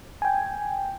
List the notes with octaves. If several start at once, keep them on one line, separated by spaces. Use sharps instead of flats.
G5 G#5